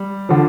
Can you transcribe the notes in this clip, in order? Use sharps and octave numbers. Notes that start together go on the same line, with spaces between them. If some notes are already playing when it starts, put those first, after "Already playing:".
Already playing: G3
D3 F3